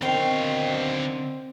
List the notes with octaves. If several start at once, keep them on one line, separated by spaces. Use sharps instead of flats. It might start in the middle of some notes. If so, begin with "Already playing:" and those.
B2 D3 D#3 C4 F5 G5 C#6